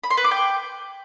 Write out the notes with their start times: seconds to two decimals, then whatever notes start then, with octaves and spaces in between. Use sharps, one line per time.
0.04 B5
0.10 C6
0.17 B4
0.24 D6
0.31 G5